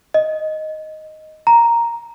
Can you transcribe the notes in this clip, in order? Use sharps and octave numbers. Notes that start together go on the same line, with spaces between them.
D#5
A#5